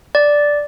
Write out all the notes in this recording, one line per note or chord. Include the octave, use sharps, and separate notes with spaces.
D5